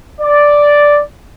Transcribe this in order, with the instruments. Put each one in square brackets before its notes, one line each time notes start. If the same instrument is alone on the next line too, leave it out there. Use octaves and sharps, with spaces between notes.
[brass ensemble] D5